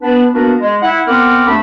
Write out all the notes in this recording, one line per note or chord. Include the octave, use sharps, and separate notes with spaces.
B3 D4 B4
A#3 B3 D4 F#4 A#4 B4
G#3
E4 F#5
B3 C4 A#4 F#5 D6 F6
D#2 A3 D4 B5